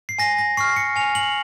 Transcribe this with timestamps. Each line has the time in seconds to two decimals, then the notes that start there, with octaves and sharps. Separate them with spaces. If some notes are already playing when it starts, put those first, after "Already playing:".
0.09 C7
0.19 G#5 A#6
0.39 A#6
0.57 C#6 F6 C7
0.76 C#7
0.96 G#5 F7
1.15 F#7